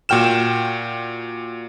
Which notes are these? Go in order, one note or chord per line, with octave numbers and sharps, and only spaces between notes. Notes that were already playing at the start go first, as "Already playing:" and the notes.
A#2 F#4 G5 F6 E7